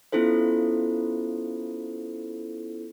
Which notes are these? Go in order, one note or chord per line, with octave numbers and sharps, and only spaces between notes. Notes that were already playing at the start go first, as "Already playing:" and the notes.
B3 C#4 E4 F4 A4 C5